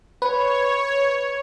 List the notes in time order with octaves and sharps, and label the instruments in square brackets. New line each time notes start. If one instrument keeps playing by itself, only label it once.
[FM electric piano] B4 [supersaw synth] C#5